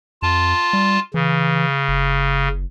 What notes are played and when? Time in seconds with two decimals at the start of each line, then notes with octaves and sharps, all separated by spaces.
0.22 F2 F4 A5
0.73 G3
1.14 C#3 E3
1.88 F#1